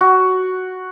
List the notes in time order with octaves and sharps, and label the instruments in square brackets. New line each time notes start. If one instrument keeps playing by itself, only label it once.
[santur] F#4